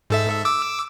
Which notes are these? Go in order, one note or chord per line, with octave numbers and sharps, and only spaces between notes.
G#2 A4 E5
D6 E6